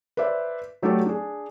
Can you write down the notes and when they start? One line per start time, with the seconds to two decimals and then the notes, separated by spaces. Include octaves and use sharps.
0.17 B4 C5 D5 E5
0.82 F#3 A3 D4 G4 A4
1.05 D4 G#4